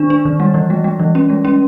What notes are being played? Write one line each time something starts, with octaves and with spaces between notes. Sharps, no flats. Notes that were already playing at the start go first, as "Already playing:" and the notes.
Already playing: D#3 D4
D4
D#3
G3
E3
G#3
G#3
E3
C#4
G#3
C#4